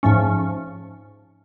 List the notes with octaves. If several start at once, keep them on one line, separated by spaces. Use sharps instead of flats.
G#2 F3 A3 C#4